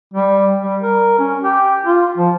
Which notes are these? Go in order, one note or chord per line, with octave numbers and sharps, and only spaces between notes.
G3
G3
A#4
C#4
G4
F4
F3